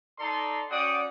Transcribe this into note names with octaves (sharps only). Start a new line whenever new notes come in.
D#4 A4 D5 A#5 C6
C#4 F#4 D5 F#5 G5 D#6